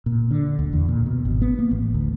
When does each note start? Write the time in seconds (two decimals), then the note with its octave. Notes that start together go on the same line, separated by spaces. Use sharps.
0.06 A#2
0.31 D3
0.59 D2
0.73 E2
0.88 A#2
1.06 B2
1.25 G#1
1.41 B3
1.59 A#3
1.71 A1
1.94 D2